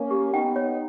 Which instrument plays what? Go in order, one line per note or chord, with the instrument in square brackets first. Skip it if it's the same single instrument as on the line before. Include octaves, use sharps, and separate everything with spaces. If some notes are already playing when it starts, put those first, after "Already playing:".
Already playing: [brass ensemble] A#3 C#4
[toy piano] G4
[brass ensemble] B3 D#4 [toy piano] G5
[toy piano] C#5